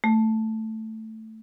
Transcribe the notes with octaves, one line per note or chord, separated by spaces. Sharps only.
A3